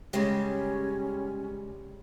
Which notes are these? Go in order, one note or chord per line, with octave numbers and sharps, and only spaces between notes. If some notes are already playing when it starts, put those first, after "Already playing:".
C#3 G3 G#3 C#4 G4